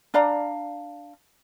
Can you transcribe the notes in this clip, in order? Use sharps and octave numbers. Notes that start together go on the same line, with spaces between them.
D4 D5 F5 A#5